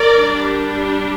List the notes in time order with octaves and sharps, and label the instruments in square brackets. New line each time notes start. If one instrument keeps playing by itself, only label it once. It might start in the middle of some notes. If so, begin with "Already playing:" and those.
Already playing: [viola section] A#4 D5
D4
G3